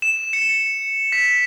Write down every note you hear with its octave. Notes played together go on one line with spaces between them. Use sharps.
E7
C#7
B6